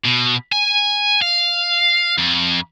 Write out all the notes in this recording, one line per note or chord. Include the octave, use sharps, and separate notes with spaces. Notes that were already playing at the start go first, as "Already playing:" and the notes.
B2
G#5
F5
F2